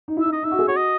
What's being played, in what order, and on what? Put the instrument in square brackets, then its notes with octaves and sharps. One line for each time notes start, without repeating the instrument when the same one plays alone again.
[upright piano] D#4
E4
[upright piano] D#4 [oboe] E5
[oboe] D#5
[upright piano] D#4 [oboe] E5
[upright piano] F#4
G#4
[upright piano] F#4 [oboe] C#5
[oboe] D#5